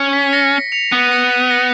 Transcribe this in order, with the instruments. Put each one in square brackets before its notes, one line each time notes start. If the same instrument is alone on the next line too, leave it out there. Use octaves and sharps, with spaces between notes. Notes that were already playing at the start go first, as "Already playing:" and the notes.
Already playing: [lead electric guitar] C#4
[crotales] B6
A#6 C#7
C#7 F7
[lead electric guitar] B3 [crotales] B6 D#7
[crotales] A#6 C#7
B6 D#7
A#6 C#7